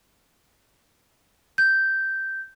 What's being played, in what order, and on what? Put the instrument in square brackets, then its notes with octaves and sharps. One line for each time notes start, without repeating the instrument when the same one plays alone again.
[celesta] G6